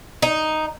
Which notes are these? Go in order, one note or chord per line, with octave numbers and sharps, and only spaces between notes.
D#4